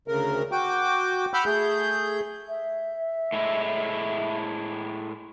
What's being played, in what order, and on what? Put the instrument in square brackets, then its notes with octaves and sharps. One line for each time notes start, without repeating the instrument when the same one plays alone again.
[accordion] D2 C#3 A#4
F#4 G5 D6
F#5 B5 D6 E6 F6 G6
A3 G#4 G6
[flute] E5
[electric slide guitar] A2 G#3 E4